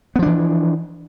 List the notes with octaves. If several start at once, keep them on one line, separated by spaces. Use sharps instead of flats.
E3 F3 B3 D4